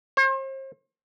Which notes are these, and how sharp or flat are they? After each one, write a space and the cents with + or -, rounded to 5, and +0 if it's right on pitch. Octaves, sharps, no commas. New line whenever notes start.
C5 +40